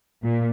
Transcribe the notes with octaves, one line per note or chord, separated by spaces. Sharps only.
A#2